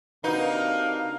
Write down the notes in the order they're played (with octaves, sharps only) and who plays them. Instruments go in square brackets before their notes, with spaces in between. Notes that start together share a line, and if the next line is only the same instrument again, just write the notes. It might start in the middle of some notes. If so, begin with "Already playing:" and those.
[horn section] C3 D4 F5 [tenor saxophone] A#3 [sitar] D#4 [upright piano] F#4 B4 D#5